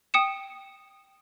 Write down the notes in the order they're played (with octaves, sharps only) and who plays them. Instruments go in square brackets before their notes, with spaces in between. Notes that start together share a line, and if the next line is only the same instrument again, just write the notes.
[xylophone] G5 D#6 C#7 E7